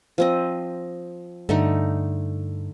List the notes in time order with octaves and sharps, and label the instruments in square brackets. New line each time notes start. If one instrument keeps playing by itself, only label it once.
[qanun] F3 C4 D#5
[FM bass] G2 [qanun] D3 A3 D#4